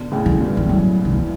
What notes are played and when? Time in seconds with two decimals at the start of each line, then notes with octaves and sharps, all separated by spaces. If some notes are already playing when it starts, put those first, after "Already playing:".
Already playing: B2 D3
0.12 A2 C#3
0.26 D3
0.40 G2 B2
0.57 E3
0.69 A2 F#3
1.05 D3
1.13 E3